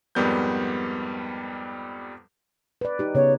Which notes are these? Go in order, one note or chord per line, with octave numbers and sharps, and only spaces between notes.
F2 G#2 G3 B3 A#4 G6
B4 D5
D#4 G4
C#3 B3 C#5